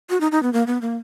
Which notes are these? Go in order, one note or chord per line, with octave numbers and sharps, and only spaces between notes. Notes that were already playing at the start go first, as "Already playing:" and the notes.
F#4
D#4
D#4
B3
A#3
B3
A#3